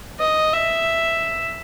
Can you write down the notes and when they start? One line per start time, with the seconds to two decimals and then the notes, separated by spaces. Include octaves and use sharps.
0.20 D#5
0.53 E5